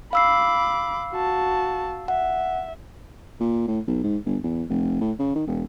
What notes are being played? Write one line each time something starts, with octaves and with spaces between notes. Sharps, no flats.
F5 B5 D6 E6 C7
F#4 A5
E5 F#5
A#2
A2
B1
G#2
G1
E2
F1
A2
C#3
D#3
E1